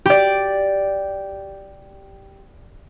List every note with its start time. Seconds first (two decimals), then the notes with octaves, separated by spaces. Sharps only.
0.06 G4 D5